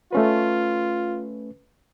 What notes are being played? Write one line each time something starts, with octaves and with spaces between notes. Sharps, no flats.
A3 C#4 F4 B4